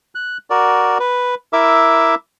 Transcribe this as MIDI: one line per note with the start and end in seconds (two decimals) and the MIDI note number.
0.15 0.38 90
0.50 0.98 66
0.50 0.98 70
0.50 0.98 74
1.00 1.35 71
1.53 2.15 64
1.53 2.15 70
1.53 2.15 76
1.53 2.15 86
1.53 2.15 88